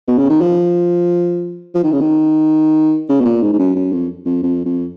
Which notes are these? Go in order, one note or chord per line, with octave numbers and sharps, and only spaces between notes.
B2
C#3
D#3
F3
F3
D#3
C#3
D#3
C#3
B2
A#2
G#2
G#2
F#2
F#2
F2
F2
F2
F2